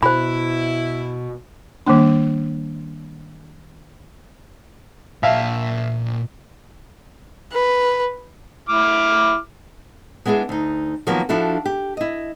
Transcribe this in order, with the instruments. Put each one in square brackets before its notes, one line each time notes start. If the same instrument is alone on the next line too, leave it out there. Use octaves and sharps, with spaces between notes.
[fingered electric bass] B2 [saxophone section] E4 [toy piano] C5 B5
[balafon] D#3 G3 A#3 D4
[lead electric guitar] A#2 A5 [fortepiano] E5 F5
[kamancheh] B4
[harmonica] E4 D6 F6
[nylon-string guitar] G#3 B3 D4 E4 G#4
D2 D#4
D#3 F3 F#3 A#3 B3
F3 D4 E4 F#4 A4
G4
E4 D#5